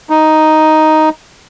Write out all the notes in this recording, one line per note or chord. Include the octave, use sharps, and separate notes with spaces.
D#4